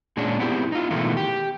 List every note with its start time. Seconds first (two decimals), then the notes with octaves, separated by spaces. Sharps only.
0.17 A#2 G#3 C#4 D4
0.39 B3 C4 E4 G4
0.72 D#4 F4
0.91 B2 D#3 E3 G#3 A3
1.17 G4